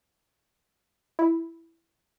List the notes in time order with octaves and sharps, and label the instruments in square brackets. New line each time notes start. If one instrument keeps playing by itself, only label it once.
[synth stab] E4